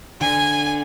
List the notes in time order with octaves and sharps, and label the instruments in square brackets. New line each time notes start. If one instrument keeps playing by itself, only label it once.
[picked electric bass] D3 [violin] G#5